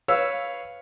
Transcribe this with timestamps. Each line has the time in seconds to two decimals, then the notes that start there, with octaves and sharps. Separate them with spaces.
0.08 B4 C#5 F5 E6